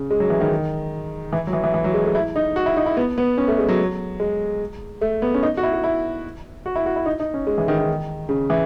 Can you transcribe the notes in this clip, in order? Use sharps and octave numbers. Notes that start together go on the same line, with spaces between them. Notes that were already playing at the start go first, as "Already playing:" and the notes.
Already playing: C#3
G#3
F#3
E3
D#3
E3
F#3
E3
E3
E3
F#3
G#3
A3
E4
D#4
F#4
E4
D#4
E4
B3
B3
C#4
A3
G#3
F#3
G#3
A3
B3
C#4
D#4
F#4
E4
F#4
E4
F#4
E4
F#4
E4
D#4
D#4
C#4
G#3
E3
D#3
D#3
C#3
E3